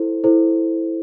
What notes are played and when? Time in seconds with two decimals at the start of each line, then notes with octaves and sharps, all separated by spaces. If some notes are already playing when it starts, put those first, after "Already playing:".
Already playing: E4 A4 C5
0.24 E4 A4 C5